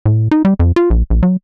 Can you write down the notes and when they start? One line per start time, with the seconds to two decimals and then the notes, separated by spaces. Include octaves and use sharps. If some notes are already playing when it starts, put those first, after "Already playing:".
0.06 A2
0.31 D#4
0.45 G3
0.60 F2
0.76 F4
0.90 A#1
1.10 A#1
1.23 F#3